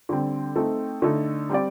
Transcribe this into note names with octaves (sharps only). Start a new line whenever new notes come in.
D3 G3 C4
A3 C4 D#4 A4
D3 A3 D#4 A4
G3 C4 G4 D5